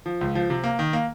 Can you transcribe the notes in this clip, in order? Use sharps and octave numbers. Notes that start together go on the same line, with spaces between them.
F3
C#2
F3
C3
A#3
D#3
A#3